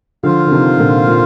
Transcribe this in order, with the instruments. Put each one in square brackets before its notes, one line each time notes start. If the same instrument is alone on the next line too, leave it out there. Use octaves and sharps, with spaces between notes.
[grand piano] D3 F3 [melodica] F4 C5 F5
[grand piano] D3
C3 D#3
A#2 D3
A#2